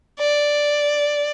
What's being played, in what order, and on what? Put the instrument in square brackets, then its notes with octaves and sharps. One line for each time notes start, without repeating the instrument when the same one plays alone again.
[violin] D5